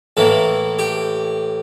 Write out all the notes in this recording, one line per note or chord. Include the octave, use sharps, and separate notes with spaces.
A2 E3 A#3 A4
G4